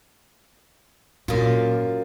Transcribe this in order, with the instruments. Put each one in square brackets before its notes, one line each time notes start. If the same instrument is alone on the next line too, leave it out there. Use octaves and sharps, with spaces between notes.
[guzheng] F#2 F4 [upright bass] A#2